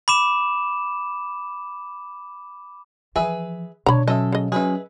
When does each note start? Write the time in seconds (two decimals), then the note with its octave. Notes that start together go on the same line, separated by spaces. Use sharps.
0.08 B5 D6 E7
3.16 E3 F3 G#4 B4 E5
3.86 B2 D3 D4 C#5 A#5 B5
4.08 F#3 C#4 A4 D#5 E5
4.32 C#3 D#5
4.52 F#3 C#4 G#4 B4 E5